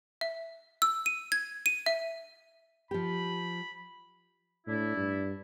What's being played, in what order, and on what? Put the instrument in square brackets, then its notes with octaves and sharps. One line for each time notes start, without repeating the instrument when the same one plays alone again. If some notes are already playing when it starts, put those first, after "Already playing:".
[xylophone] E5
E6
D#7
G#6
D#7
E5
[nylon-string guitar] F3 G4 [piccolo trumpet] B5
[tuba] A2 [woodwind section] D4 E4
[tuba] G2